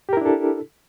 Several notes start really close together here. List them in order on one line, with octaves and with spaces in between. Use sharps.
G4 A#4 E4 D4 A4